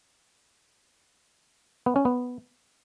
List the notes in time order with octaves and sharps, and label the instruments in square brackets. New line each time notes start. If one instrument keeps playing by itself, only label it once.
[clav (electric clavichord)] B3
C#4
B3